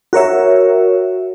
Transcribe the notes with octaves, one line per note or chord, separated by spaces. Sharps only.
F#4 A#4 C#5 E5